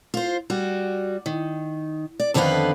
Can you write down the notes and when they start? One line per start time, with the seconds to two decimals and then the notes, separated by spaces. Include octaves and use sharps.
0.14 F4 C5
0.50 G3 F#4
1.26 D#3
2.20 D5
2.34 F2 D3 D#3 B3 B4 F5